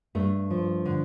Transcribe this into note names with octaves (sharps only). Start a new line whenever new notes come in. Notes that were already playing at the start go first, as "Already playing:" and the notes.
G2 A3
F3
D3